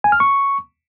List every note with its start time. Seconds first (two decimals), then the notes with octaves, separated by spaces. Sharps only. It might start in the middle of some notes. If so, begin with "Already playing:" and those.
0.04 G#5
0.12 F6
0.20 C#6